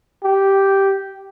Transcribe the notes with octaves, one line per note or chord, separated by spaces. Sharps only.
G4